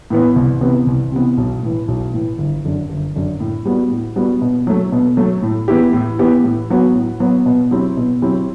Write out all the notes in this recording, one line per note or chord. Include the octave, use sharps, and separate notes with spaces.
A2 E3 B3
C2
C3 E3 B3
C2
C3 E3 B3
B1
A2 E3
B1
A2 E3
G1
F#2 D3
G1
F#2 D3
A2
G3 B3 F#4
A2
G3 B3 F#4
B2
F#3 A3
B2
F#3 A3
A2
E3 B3 E4 G4
A2
E3 B3 E4 G4
A2
F#3 B3 F#4
A2
F#3 B3 F#4
B2
F#3 C4 E4 G4
B2
F#3 C4 E4 G4